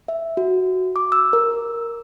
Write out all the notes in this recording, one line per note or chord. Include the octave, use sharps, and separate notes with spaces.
E5
F#4
D6
E6
A#4